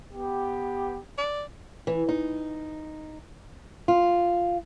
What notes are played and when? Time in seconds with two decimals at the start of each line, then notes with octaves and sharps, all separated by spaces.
0.13 B3 G4
1.18 D5
1.87 E3
2.09 D#4
3.88 F4